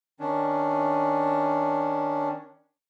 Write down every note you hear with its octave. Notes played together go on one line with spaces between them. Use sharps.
D#3 C#4 D4